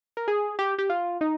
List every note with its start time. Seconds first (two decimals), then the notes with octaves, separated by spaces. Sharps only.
0.17 A#4
0.28 G#4
0.59 G4
0.78 G4
0.90 F4
1.21 D#4